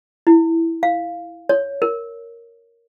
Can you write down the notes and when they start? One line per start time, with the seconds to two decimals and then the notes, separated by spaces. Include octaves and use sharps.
0.27 E4
0.83 F5
1.49 C#5
1.82 A#4